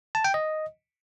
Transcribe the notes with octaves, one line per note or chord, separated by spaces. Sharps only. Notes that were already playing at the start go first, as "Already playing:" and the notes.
A5
G5
D#5